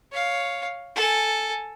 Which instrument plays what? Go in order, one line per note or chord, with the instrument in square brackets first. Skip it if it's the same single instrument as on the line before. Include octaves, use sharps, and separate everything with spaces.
[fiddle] C#5 F5
A4 G#5